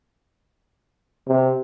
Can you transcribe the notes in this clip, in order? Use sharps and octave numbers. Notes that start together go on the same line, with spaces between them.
C3